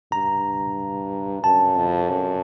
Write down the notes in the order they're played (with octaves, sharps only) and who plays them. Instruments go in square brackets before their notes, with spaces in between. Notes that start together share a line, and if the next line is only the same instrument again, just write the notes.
[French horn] G2 [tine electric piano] A#5
[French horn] F#2 [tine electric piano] A5
[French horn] F2
F#2